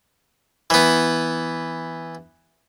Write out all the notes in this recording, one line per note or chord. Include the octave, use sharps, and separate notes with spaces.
E3 B3